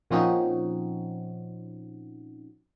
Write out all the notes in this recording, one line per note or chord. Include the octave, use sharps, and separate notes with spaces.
A#2 F3 C4 C#4 D#4 F#4